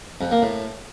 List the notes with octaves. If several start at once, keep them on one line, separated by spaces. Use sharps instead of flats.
F2
A#3
A2